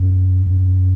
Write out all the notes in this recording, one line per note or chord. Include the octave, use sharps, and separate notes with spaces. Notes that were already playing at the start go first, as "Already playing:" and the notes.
Already playing: F#2
F#2